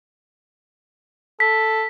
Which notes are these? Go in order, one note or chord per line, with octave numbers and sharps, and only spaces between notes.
A4 B6